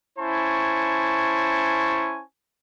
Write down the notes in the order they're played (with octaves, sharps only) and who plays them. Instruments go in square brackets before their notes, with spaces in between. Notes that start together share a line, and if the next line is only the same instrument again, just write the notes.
[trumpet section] C#4 E4 C5 G#5 A5 C#6